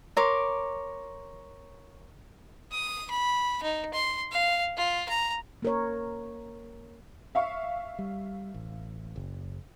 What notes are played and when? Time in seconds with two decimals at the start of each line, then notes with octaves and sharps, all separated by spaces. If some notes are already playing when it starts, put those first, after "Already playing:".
0.17 A#4 C#5 C6 D6
2.71 D#6
3.10 B5
3.63 D#4
3.93 C6
4.32 F5
4.77 F4
5.09 A#5
5.62 A#3 A#4 C#5
7.35 E5 F5 C#6
7.99 G3
8.54 A1
9.16 F#1